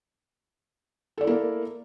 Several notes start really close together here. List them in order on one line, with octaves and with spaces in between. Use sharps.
A4 D5 E4 A#3 A#4